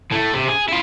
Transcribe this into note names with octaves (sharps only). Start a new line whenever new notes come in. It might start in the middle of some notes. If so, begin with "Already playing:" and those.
A2 A3
C3
G#4
E4 F4